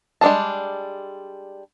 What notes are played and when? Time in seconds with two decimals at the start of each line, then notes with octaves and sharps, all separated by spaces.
0.21 G3 G#3 D4 G#4 A5